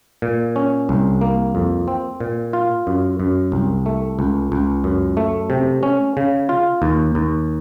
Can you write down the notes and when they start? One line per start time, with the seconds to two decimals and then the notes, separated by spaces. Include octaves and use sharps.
0.22 A#2
0.56 C#4
0.89 C2
1.21 A#3
1.55 F2
1.88 C4
2.20 A#2
2.53 F4
2.87 F#2
3.20 F#2
3.52 C2
3.86 A3
4.19 C#2
4.52 C#2
4.84 F#2
5.17 A3
5.50 C3
5.83 C#4
6.17 C#3
6.49 F4
6.82 D#2
7.15 D#2